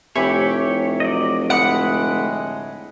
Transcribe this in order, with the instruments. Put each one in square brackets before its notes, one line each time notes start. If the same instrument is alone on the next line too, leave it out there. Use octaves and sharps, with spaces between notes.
[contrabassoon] F1 [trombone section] A2 C3 G4 [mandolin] E4 G#5 [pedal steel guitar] C#5
[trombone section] F#3 [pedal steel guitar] D5 D#5
[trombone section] A2 D3 G#3 [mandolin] F#5 [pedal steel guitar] G5 B5 D#6